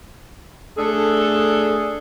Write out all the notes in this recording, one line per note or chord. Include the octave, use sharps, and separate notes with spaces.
A3 D4 G#4 A4